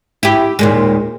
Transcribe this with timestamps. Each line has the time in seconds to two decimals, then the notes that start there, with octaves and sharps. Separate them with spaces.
0.23 E4 G4
0.59 D#2 A#2 G#3